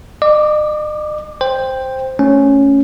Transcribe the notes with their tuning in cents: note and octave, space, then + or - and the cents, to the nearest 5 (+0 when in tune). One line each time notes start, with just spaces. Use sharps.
D#5 -45 D6 +0
C5 +0 G5 +10
A3 +0 C#4 +0